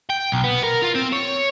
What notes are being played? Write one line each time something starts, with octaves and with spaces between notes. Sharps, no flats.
G5
B1
B3
A#4
F4
C4
C#5